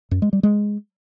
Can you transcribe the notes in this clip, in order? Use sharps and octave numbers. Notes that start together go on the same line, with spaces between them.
F#2
G#3
G3
G#3